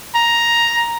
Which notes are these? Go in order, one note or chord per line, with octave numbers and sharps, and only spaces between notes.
A#5